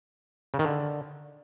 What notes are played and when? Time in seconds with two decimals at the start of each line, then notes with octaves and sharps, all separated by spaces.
0.54 C#3
0.59 D#3
0.65 D3